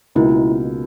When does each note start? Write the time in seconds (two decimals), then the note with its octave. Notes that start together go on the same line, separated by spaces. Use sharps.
0.15 C#2 B2 A#3 D#4 E4 A#4